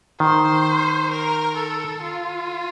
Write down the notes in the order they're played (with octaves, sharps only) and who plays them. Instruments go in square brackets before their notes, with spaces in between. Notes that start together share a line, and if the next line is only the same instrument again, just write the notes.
[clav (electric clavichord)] D#3 [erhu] C5
[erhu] A#4
A4
F4